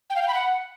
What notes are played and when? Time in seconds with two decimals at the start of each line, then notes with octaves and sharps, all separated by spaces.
0.10 G5
0.16 F5
0.22 G5
0.28 B5
0.34 F#5